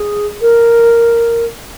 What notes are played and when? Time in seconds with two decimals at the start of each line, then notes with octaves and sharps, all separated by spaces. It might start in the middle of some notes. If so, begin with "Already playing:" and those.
Already playing: G#4
0.41 A#4